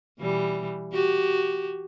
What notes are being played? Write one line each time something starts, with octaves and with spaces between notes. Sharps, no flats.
B2 E3 G3
F#4 G4